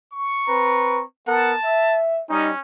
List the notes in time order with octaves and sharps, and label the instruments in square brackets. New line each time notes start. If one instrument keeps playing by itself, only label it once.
[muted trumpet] C#6
[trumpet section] C4 B4 A#5
[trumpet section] B3 A#4 F#5 [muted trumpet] A5
[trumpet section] E5
[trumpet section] G3 D#4 [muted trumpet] C#4